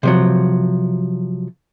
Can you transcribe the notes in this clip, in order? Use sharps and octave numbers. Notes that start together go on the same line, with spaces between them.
C3 F3 F#3